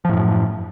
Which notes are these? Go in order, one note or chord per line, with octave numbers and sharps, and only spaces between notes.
F#2 A2 F3